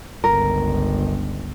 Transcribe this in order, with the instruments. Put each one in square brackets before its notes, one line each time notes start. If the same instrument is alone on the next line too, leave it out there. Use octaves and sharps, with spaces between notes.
[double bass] G1 C#2 [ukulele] A#4